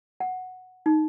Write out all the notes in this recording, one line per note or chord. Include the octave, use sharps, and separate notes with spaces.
F#5
D#4